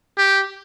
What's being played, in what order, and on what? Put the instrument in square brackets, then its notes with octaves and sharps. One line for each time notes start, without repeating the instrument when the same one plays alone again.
[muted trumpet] G4